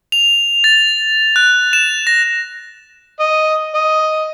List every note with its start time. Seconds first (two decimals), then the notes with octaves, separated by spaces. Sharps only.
0.12 F7
0.64 A6
1.36 F#6
1.73 E7
2.07 A#6
3.20 D#5
3.75 D#5